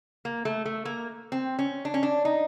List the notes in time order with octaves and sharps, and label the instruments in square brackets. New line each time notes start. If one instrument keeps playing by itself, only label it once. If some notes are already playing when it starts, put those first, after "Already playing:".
[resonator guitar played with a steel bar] A#3
A3
A3
A#3
C4
C#4
D4
C#4
D4
D#4